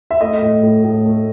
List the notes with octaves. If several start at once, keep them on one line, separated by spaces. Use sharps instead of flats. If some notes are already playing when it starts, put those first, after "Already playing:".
E5
A3 D#5
A2
A2
A2
A3